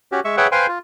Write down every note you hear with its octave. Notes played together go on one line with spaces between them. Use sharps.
C#4 F#4 G4
G#3 E5 C#6
G#4 B4 C#5 E5 F#5 G5
B4 C5 F5 G5 G#5 C6
F4